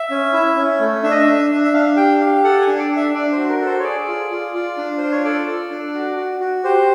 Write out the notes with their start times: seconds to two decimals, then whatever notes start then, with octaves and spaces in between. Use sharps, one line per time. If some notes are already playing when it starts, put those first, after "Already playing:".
Already playing: E5
0.10 C#4
0.33 E4
0.56 C#4
0.80 A3
1.03 D4 E5
1.11 D#5
1.19 E5
1.26 D4
1.50 D4
1.64 E5
1.73 D4 F5
1.96 G4 G5
2.21 G4 F5
2.44 A4 F#5
2.61 G#5
2.67 D4
2.78 D5
2.90 D4
2.96 E5
3.14 D4 D5
3.32 F#4 C5
3.49 A#4
3.61 A4 C5
3.80 C#5
3.84 G#4 D5
4.08 F4
4.31 F4
4.55 F4
4.77 D4
4.98 F4 C5
5.11 C#5
5.24 A4 D5
5.48 A4
5.70 D4
5.95 F#4
6.17 F#4
6.40 F#4
6.64 G4 C5